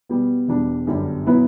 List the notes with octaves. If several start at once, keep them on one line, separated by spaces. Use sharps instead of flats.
B2 G3 B3
E1 E2 B2 G3 D4
G1 F#2 D3 G3 D4
B2 F#3 B3 E4 B4